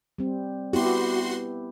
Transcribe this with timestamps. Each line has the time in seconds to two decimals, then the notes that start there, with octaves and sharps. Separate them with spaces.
0.18 G3 C4
0.73 B3 E4 F#4 G4 C6